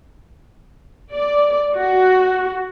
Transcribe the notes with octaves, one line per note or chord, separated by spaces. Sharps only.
D5
F#4